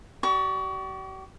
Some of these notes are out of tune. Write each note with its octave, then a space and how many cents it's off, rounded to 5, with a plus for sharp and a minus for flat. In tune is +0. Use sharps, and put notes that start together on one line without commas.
G4 -45 D5 +0 C#6 +25